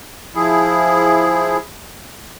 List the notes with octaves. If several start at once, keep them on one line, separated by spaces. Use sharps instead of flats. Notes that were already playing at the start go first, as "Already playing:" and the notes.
F3 E4 G#4